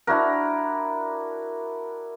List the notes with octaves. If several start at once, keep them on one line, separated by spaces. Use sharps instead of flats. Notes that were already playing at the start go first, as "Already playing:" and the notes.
D4 E4 F#4 A#4